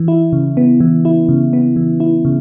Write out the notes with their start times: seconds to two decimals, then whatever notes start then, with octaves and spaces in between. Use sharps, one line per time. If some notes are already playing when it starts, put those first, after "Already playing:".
Already playing: E3
0.08 E4
0.33 C#3
0.57 B3
0.80 E3
1.05 E4
1.29 C#3
1.53 B3
1.76 E3
2.00 E4
2.25 C#3